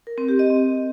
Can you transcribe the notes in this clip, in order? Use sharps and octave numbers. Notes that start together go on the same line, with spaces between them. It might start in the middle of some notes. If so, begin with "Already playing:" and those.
A#4
C4
G4
D#5
C4